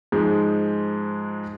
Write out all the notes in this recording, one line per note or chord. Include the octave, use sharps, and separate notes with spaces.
G#2 F3 G#3